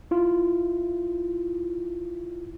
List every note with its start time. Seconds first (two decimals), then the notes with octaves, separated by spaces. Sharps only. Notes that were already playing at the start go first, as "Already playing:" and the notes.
0.11 E4 F4